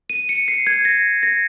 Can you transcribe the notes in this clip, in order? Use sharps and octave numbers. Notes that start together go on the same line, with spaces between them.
D#7
C#7
C7
G#6
A#6
A#6